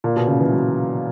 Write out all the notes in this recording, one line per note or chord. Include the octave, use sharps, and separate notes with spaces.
A#2
B2
C#3
E3
F#3